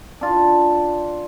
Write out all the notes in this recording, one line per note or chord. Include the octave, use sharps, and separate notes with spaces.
D4 F4